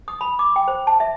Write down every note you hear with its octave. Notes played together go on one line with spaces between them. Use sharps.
D#6
B5
D6
G5
C5
A5
E5